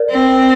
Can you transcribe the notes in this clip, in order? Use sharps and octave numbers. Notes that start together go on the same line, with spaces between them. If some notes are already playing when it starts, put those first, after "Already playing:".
Already playing: A#4 D5
C4